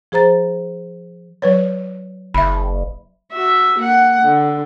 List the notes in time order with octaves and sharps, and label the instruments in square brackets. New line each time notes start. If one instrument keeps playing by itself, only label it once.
[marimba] F3 G#4 C5 A#5 A6
[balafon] F#3 B4 C#5
[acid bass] F#1 [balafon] E5 B5
[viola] F#4 E5
A#3 F#5
D3